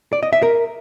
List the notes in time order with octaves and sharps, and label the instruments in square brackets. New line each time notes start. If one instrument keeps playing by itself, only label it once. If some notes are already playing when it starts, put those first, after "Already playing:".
[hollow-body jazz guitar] D5
D#5
E5
A#4